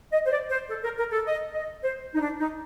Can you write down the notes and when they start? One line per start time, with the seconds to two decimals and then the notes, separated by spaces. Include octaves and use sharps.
0.13 D#5
0.26 C5
0.31 D5
0.50 C5
0.70 A4
0.84 A#4
0.98 A#4
1.11 A4
1.27 D#5
1.54 D#5
1.83 C5
2.15 D#4
2.21 D4
2.40 D#4